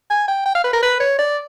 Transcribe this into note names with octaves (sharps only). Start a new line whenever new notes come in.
G#5
G5
G5
F5
B4
A#4
B4
C#5
D5